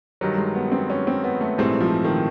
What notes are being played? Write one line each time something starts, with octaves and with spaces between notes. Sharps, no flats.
G2 D#3 F#3 G3
G#3
B3
C4
C#4
C4
B3
A3
A#1 G#2 E3 G3 A3 C4
F3
D#3